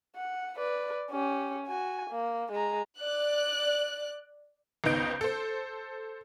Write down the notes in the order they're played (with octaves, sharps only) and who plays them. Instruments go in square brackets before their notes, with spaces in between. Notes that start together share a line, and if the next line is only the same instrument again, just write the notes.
[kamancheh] F#5
B4 D5
C#4 G4
F#4 G#5
A#3
G#3 A#5
[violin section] D5 F#6
[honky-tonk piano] G#1 C#2 B3 D#4 G6 D7
A4 C5